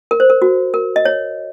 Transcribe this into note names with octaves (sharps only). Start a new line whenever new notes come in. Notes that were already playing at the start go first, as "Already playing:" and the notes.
A#4
C5
A#4
F#4
A#4
D#5
C#5